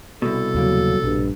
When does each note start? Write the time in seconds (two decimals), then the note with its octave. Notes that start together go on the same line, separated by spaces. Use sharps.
0.22 C2 B2 A4
0.55 D#2 C#3 F#3 A#3
1.03 A#1 G2